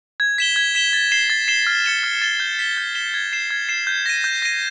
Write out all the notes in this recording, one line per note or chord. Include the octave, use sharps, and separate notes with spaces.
G#6
B6 E7 G7
G#6
B6 E7 G7
A6
C7 E7 G7
A6
C7 E7 G7
F6
A6 C#7 E7 G7
F6
A6 C#7 E7 G7
G6
B6 E7 G7
G6
B6 E7 G7
G#6
C7 E7
G#6
C7 E7
G6
A#6 D#7
G6
A#6 D#7